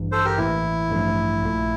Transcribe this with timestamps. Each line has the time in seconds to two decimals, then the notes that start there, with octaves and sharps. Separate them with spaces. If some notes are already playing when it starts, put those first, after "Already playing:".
Already playing: A1 G2 E3
0.12 A4 C5
0.25 G4 A#4
0.38 A1 A2 E3 A#3 E4
0.90 A1 G2 F3 A3
1.42 A#1 A#2 A3